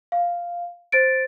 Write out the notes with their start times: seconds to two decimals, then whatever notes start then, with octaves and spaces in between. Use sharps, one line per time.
0.12 F5
0.92 C5 A6 D7